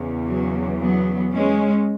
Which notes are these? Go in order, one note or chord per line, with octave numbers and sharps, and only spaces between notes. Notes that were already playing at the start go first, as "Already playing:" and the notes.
Already playing: E2 C#3 E3
F#3
F#3 B3
G#3 C#4